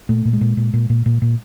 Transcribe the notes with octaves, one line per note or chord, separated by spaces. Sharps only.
A#2 A3
A#2
G#3
A#2
A#2
A#2
A#2
A#2
A#2